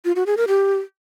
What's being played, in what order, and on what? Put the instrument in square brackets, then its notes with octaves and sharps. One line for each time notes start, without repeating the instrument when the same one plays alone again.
[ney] F4
F#4
G#4
A#4
G4